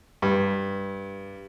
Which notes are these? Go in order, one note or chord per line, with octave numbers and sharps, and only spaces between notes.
G2